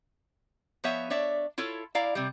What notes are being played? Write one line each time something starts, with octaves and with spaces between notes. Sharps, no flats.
F3 B3 C#5 E5
D4 C#5 D5 E5
E4 F4 A4 C#5
E4 D5 F5 A#5
C3 G3